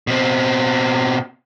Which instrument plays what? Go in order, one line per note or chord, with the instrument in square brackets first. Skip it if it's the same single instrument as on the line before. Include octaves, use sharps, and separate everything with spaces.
[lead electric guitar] B2 C4